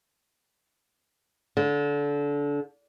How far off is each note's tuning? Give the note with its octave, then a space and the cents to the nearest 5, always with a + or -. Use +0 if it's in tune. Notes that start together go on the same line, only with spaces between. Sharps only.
D3 -25